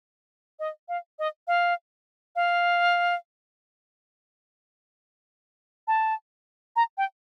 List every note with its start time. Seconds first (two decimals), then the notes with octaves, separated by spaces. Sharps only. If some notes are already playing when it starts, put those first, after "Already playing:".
0.59 D#5
0.89 F5
1.19 D#5
1.47 F5
2.36 F5
5.87 A5
6.76 A#5
6.98 G5